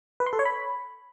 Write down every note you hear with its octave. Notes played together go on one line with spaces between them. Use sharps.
B4
C6
A4
C#5
B5